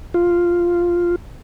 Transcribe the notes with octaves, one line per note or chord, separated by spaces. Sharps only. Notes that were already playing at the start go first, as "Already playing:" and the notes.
F4